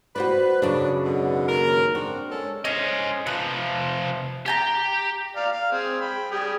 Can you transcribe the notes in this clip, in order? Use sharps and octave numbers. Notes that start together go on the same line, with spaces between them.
F#4 B4 C5 D5
F#2 C#3 D4
G#2 B2 D3
D#2 A#4
C4 D4 F#4
G#3 C#4 A4
C#4 C5 D#5
C3 F3 B4
G4 G5 G#5 A#5
D5 F5 A#5
F5
C4 G#4
G5 B5
G3 G#4 G5